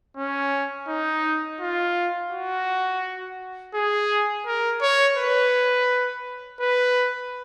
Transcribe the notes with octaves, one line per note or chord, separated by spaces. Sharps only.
C#4
D#4
F4
F#4
G#4
A#4
C#5
B4
B4